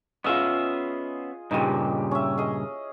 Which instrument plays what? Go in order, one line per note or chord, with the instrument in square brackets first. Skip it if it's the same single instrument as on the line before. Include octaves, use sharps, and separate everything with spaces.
[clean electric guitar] B3 C#4 E5 [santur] F4 G#4 D#5
[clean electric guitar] G2 A#2 C#3 [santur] D#4 G4
[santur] C#4 E5
G#4 D#5